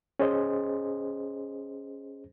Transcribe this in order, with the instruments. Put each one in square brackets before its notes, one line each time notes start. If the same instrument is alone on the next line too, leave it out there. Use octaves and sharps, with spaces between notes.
[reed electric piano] C#4 G#4 C5 D#5